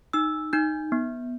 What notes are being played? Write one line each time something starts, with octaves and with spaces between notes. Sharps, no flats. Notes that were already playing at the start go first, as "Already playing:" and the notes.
D#4 E6
D#4 G6
B3